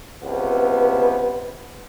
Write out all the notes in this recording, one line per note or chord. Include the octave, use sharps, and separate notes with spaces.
C#2 C3 B3 B4